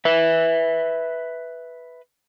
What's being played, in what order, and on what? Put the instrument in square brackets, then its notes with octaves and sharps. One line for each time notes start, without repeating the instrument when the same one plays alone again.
[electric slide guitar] B4 E5